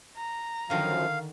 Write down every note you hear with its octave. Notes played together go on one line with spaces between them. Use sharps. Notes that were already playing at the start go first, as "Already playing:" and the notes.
A#5
F#2 D3 D#3 F3 F5